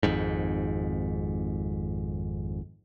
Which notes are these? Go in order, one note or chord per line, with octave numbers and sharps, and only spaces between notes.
G#1 F2 G#2